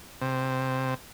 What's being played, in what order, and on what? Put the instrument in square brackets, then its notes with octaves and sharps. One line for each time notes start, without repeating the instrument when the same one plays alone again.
[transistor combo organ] C3